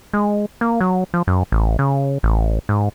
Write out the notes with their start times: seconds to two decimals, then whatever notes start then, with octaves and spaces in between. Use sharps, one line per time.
0.13 G#3
0.61 A#3
0.81 F#3
1.14 F3
1.27 F#2
1.52 A1
1.79 C#3
2.23 A1
2.69 G#2